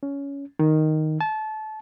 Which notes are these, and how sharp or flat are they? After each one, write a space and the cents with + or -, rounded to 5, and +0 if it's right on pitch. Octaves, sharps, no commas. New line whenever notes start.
C#4 +15
D#3 +0
A5 -25